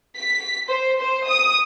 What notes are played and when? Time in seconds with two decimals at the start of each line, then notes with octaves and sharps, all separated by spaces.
0.18 B6
0.68 C5
0.98 C5
1.27 D#6